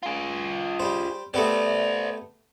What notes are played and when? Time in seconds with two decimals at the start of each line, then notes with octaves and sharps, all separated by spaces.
0.03 F4 G#4
0.80 G3 C5
1.34 A3 B3 G4 C5 D5